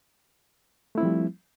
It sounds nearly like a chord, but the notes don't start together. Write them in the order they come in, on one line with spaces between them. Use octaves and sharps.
A3 E4 C4 F3 G3